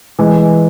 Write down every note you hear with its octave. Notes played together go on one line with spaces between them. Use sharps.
E3 G#3